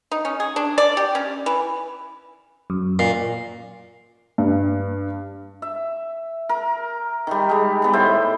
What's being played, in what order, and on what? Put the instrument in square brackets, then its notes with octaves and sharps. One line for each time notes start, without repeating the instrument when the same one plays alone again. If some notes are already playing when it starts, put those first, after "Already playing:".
[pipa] D#4
C#4
G#4
D4
D5
G4
C#4
E3
[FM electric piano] F#2
[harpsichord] A#2 [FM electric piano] C7
[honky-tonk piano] G2
[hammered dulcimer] E5
A#4
D#3 G3
G3 G#3
G3 B3
A2 C5 E5 G5